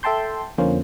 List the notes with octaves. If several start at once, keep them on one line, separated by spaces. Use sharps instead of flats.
A4 E5 G5 A5 C6 G6
F2 D3 A#3 C#4 F4 C5